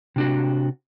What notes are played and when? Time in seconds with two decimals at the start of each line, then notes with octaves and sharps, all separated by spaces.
0.16 C3 D4 F#4